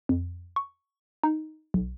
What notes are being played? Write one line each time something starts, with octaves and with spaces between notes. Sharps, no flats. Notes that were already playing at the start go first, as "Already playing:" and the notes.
F2
C#6
D#4
B1